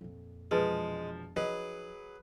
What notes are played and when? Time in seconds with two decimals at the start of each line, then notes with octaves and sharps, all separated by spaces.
0.01 F2 A#2
0.51 E1 F3 G#3 G#4 B4
1.36 F3 F#3 D#4 G#4 B4 D#5